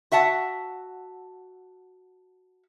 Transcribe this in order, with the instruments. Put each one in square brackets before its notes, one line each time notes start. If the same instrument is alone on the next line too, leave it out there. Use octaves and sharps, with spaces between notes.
[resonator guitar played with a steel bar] F#4 E5 F#5 A5